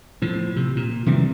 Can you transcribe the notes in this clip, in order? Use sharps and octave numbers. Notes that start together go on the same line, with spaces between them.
A2 F3
C3
A#2
C3 D#3 E3 G3